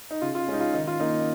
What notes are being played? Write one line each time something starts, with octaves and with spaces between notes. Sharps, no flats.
D#4
C#3 F4
F4
G#3 C#4 D#4
F4
D#3 D#4
F4
A#3 C#4 D#4